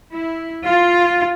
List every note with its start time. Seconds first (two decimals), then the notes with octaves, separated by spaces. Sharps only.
0.13 E4
0.67 F4